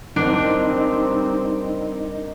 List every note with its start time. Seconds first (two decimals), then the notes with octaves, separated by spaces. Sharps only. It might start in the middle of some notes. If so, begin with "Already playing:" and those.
0.16 C#3 G3 C4 D4 D#4 A#4